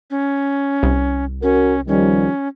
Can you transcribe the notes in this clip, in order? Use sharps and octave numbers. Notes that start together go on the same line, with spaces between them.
C#4
C2
C#4 F#4 A#4
D#3 F3 G3 C#4